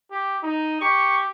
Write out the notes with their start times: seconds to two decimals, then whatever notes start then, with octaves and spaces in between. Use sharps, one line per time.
0.11 G4
0.43 D#4
0.81 G4 C#6